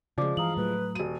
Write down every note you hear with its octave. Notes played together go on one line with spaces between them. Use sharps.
C#3 F3 G#3 D5 D6
G2 E3 F5 A#5 D#6 F#7
A2 F#3 A3 B4
D#1 F#4 D#7